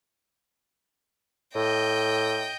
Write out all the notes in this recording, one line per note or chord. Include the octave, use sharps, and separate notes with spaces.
A2 D#5 G5